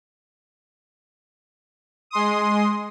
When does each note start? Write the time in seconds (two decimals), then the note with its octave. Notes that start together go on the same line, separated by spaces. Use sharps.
2.11 G#3 C6 D#6